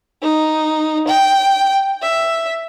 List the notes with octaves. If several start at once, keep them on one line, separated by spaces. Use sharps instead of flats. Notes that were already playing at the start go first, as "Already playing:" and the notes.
D#4
G5
E5